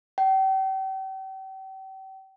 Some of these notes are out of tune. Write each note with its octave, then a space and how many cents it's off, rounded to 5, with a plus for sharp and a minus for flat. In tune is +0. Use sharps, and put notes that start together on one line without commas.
G5 -40